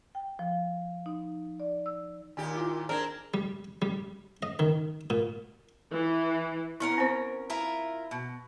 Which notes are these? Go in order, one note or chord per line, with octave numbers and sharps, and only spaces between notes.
G5
F3
D#4
D5
E6
D#2 A#2 G4 G#5
E4 F4 D6
C4 D4 G#4 A#4 G#6
G3
G3
D#5
D#3
A#2
E3
B3 C#4 E4 A#4
C4 C5
E4 F4 A#4
B2